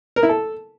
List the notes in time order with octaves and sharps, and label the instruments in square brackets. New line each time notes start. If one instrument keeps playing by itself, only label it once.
[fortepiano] A#4
E4
A4